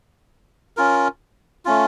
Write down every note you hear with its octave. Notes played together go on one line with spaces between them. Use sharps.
C#4 F4 A#4
A3 C#4 F4